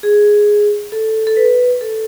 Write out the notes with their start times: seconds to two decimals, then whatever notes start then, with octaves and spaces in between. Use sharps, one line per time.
0.03 G#4
0.92 A4
1.27 A4
1.37 B4
1.81 A4